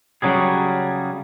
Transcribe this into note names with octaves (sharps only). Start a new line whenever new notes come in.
C#3 F#3 G3 G#4